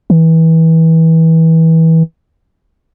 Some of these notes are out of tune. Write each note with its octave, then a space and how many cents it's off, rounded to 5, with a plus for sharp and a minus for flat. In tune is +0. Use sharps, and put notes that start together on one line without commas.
E3 -25